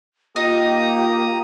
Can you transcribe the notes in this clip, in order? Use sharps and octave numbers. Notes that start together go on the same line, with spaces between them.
A#3 D#4 F4 G4 A#5 D#6